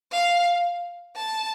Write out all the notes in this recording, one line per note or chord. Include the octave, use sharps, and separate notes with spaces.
F5
A5